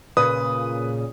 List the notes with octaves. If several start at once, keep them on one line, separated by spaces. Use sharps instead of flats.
A#2 C#3 B4 D#6